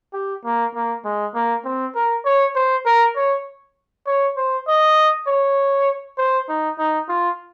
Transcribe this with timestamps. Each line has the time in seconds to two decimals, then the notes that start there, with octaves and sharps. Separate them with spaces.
0.13 G4
0.45 A#3
0.75 A#3
1.05 G#3
1.35 A#3
1.65 C4
1.95 A#4
2.25 C#5
2.55 C5
2.86 A#4
3.16 C#5
4.07 C#5
4.36 C5
4.67 D#5
5.27 C#5
6.18 C5
6.49 D#4
6.78 D#4
7.09 F4